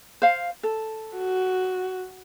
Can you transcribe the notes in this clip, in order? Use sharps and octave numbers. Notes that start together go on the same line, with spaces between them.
C5 F5
A4
F#4